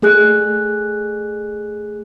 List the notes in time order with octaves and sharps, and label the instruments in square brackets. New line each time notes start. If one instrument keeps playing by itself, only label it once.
[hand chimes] A3 G#4 F#6